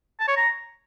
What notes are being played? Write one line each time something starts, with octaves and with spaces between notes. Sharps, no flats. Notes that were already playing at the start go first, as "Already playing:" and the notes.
A5
C#5
A#5